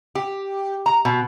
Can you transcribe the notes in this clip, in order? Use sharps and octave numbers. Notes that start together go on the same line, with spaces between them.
G4
A#5
B2